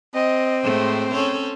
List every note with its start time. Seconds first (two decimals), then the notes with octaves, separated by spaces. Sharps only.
0.15 C4 D#5
0.63 A2 G#3 A3 C5
1.14 C#4 A4 C#5